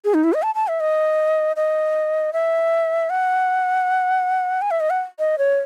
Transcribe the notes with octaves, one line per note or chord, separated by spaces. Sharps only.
G#4
D#4
E4
D#5
A5
A5
E5
D#5
D#5
E5
F#5
G#5
E5
D#5
F#5
D#5
C#5